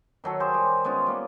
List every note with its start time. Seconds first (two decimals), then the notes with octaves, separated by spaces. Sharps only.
0.24 D#3 F#3 A4 C#5
0.40 G4 G#4 C5
0.54 G3
0.85 G#3 B3 C#4 F4
1.06 G3 A#3